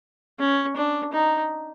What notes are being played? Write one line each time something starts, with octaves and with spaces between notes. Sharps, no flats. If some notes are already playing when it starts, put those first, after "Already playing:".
C#4
D4
D#4